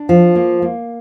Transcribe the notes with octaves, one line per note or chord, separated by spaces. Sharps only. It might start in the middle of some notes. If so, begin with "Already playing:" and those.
Already playing: D4
F3
A#3
A#3